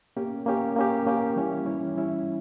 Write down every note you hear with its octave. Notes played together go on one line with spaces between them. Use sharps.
A#3 C#4 G4
A#3 C#4 G4
A#3 C#4 G4
A#3 C#4 G4
E3 G3 C#4 E4
E3 G3 C#4 E4
E3 G3 C#4 E4